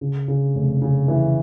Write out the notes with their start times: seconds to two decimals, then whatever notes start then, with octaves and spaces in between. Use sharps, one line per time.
0.01 C#3
0.28 C#3
0.55 F1
0.82 C#3
1.08 E3